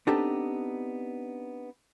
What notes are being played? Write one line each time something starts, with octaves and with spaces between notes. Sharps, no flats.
B3 C4 D4 D#4 G4 A4